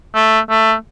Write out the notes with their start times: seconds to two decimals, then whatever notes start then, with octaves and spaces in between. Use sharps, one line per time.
0.15 A3
0.50 A3